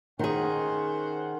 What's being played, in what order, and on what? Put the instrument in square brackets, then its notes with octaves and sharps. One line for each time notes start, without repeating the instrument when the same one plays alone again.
[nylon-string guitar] D#3 G#4 [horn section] C#4 C5 F#5